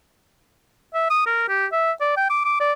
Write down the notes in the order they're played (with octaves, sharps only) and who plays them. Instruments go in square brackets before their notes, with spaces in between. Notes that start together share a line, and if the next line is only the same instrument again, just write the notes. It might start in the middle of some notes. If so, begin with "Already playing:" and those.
[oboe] E5
D#6
A#4
G4
E5
D5
G5
D6
D6
D5